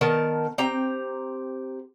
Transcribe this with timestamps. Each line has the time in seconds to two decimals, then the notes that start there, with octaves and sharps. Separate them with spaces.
0.01 D#3 B3 A#4 A5
0.58 C4 G4 A#5